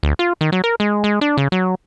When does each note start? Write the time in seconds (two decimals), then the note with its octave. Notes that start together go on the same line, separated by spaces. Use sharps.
0.03 D2
0.19 F4
0.41 D#3
0.52 F#3
0.64 A#4
0.80 G#3
1.04 G#3
1.21 D4
1.37 C#3
1.52 F#3